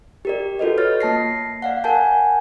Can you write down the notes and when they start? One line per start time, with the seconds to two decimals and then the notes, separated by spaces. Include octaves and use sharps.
0.25 G4 A#4 D5
0.59 F4 F#4 A4 B4 D#5
0.77 C#5 F6 A6
1.01 A#3 A5 A#6 C7
1.62 D5 F5 F#5
1.84 A#4 F#5 G#5 A5 G6